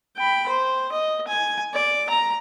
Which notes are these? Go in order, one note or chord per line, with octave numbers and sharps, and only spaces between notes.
G5 B5
C5
D#5
G#5
D5
A#5